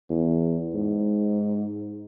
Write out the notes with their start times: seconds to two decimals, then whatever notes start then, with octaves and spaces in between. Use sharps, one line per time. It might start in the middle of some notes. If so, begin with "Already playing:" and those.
0.10 E2
0.74 G#2